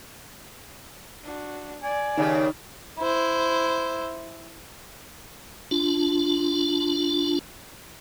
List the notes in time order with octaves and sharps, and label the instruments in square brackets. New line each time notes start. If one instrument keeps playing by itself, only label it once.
[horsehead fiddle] D4 F#4
[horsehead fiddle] D5 [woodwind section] G#5
[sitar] D#2 C#3 G4 [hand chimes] D#4
[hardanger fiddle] E4 C5
[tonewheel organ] D4 F4